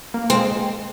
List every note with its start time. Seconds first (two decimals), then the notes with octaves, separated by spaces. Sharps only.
0.14 A#3
0.30 G#3 C4